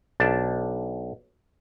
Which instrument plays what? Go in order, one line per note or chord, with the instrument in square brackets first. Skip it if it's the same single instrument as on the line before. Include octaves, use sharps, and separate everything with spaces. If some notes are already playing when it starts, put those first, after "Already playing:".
[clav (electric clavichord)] B1 D4 A5